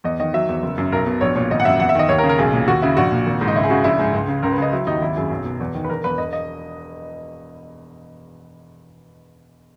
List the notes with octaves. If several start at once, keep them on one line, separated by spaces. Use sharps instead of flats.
E2 D#5
D#3 D#5
F#3 E5
E2
F#1
F#2
B1 A#4
B2
A#1 C#5
A#2 C#5
G#1 D#5
F#5
F#2 E5
E2 F#5
E5
D#3 D#5
D#2 C#5
A#4
C#3
A#4
B1 G#4
A#2
D#2 F#4
C#3 E4
A#1 F#4
A#2
G#1
G#2
D#4
C#2 E4
G#4
C#3 F#4
A#1 E4
G#2 G#4
C#2
C#3
C#2 A#4
B4
C#3 D#5
F#3 E4
D#2 D#4
G#1 E4
F#2 G#4
B1
B2
E2
D#3
B4
E1 A#4
E2 B4
E1 D#5
D#5